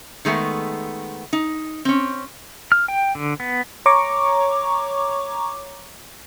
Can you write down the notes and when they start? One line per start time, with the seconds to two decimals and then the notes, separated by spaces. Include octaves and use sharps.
0.25 D#3 G#3 A3 B3
1.33 D#4
1.85 C4 C#4
2.72 F6
2.88 G5
3.15 D3
3.40 B3
3.86 C#5 A#5 C#6 D6